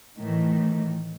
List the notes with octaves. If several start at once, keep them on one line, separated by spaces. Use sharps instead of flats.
A2 D#3 E3